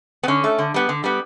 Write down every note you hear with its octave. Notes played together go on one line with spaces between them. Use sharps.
B3
D3 C#4
A3
D3
G3 B3
D3
G3 B3